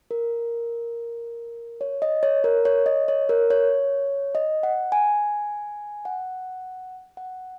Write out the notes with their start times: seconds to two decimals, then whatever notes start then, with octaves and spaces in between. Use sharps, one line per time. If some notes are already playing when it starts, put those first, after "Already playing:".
0.11 A#4
1.81 C#5
2.02 D#5
2.23 C#5
2.44 A#4
2.65 C#5
2.86 D#5
3.08 C#5
3.29 A#4
3.50 C#5
4.35 D#5
4.63 F#5
4.92 G#5
6.05 F#5
7.17 F#5